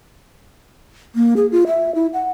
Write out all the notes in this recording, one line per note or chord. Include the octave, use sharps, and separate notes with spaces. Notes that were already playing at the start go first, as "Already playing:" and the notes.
A#3
G#4
F4
E5
E4
F#5